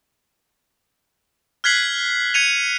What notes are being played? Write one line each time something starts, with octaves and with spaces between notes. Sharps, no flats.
F6 F#6 G#6 B6 C7 F#7
G#6 C#7 D#7 F7